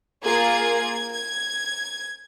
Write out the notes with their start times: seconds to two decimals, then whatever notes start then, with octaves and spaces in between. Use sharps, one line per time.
0.24 A#3 F4 G#4 G#6
1.14 G#6